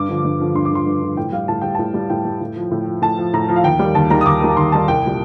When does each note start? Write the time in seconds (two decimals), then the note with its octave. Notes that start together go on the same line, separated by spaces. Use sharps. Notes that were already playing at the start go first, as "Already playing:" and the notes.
Already playing: G2 D6
0.09 D3 F3
0.24 G2
0.40 D3 F3
0.55 G2 C6
0.65 D6
0.71 D3 F3 C6
0.87 G2
1.02 D3 F3
1.17 A2 G5
1.32 G3 F5
1.48 A2 A5
1.62 G3 G5
1.75 A2 A5
1.94 G3
2.10 A2 G5
2.25 G3
2.41 A2
2.56 F3
2.71 A2
2.86 F3
3.02 A2 A5
3.18 F3
3.33 A2 A#5
3.49 F3
3.56 F5
3.64 D#2 G5
3.79 D#3 G3
3.95 D#2 A5
4.10 D#3 G3 A#5
4.21 D#6
4.26 D#2 D6
4.41 D#3 G3
4.57 D#2 C6
4.72 D#3 G3 A5
4.88 C2 G5
5.03 A#2 G3